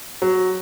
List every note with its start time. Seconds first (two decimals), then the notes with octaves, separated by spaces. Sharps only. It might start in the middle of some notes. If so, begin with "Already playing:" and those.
0.22 F#3